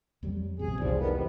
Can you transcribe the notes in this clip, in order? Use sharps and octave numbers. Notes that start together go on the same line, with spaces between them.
F2 F#3 G3
A#1 E2 C3 G#4
F1 C2 G#2 E3 F3 G3
D#3 B3
C3